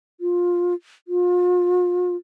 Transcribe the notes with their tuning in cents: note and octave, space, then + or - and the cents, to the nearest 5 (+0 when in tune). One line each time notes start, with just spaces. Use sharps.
F4 +15
F4 +35